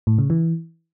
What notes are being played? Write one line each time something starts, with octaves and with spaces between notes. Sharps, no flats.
A2
C#3
E3